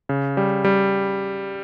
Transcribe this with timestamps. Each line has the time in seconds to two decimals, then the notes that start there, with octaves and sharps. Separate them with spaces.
0.09 C#3
0.37 G3
0.65 G3